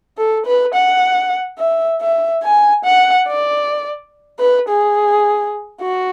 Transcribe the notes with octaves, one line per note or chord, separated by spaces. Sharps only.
A4
B4
F#5
E5
E5
G#5
F#5
D5
B4
G#4
F#4